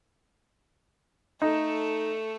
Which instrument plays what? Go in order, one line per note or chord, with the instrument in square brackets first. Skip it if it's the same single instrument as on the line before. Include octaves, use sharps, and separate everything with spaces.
[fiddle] A3 A4 [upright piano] D#4